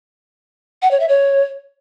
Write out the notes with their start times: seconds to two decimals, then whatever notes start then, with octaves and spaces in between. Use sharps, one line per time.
0.82 F#5
0.91 C#5
1.00 E5
1.09 C#5